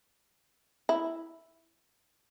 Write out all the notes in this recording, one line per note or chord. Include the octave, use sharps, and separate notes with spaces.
E4